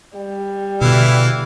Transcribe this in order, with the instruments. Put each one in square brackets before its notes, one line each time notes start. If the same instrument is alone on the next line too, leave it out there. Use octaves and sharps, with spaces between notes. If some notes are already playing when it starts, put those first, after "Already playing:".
[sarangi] G3
[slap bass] B2 D3 [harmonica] E3 E4 F5